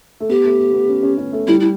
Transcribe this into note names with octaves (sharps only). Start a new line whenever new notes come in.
A3
B3 G4
A3
B3
B3
C#4
C#4
C#4
A3
G3 E4
E4